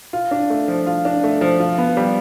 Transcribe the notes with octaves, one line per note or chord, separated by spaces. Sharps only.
F4
D4
A3
F3
F4
D4
A3
F3
F4
B3
G3